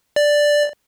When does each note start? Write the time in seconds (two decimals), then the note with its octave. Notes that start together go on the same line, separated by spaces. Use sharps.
0.16 D5